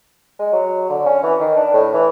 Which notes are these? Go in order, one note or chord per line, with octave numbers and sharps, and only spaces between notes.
G#3
F#3
D3
C#4
E3
D#3
D4
A2
E3